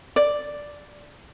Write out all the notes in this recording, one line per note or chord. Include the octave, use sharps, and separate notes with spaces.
D5